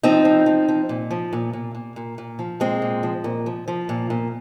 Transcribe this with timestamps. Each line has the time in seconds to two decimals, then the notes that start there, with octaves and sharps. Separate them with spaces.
0.03 F3 C4 D#4
0.25 F3
0.46 F3
0.68 F3
0.89 A#2
1.11 F3
1.33 A#2
1.53 A#2
1.75 A#2
1.96 A#2
2.18 A#2
2.39 F3
2.60 A#2 G#3 C4
2.82 A#2
3.03 F3
3.24 A#2
3.46 F3
3.68 F3
3.89 A#2
4.10 A#2